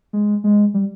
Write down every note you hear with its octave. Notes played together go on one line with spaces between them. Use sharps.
G#3
G#3
G3